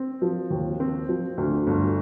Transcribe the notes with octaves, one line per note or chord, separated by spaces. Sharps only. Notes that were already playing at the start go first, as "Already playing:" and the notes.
Already playing: C4
F3
D#2
C4
F3
D2
G1